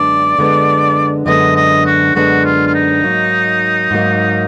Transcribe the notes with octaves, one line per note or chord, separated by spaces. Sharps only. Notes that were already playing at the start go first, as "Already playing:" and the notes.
Already playing: F#2 D3 G#3 B3 D4 D5
F#2 D3 G#3 B3 D4
F#2 D3 G#3 B3 D4 D#5
D#5
F#4
F#2 D3 G#3 B3 D4 F#4
F4
F4
D#4
G#2 F#3 A#3
G#2 F#3 A#3